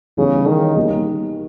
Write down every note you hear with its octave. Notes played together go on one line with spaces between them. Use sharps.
C#3 E3 G3 B3 D#4
D#3
G3 A#3 D#4